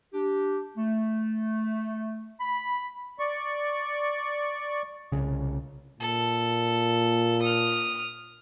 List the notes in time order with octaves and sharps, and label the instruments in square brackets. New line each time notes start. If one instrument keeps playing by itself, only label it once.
[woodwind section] D4 G4
A3
B5
[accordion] D5 C#6
[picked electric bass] C2 C#3
[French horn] A#2 [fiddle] A4
[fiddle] D#6 F6